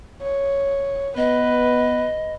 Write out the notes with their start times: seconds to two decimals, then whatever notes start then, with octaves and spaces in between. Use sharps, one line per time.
0.22 C#5
1.17 B3 B4 D#5